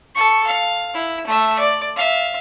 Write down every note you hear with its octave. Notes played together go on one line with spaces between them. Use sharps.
A4 C#6
F5
E4
A3 E5
D5
E5 F5